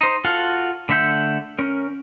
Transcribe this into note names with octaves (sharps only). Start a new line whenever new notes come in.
D#4 C5
F4 F#4 A4 F5 F#5
D3 A3 E5 F#5 G6
C#4 A#4